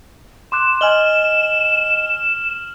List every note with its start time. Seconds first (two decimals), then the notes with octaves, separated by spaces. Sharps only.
0.52 C6 D6 F#6 E7
0.81 D#5 G#5 F6 F#7 G7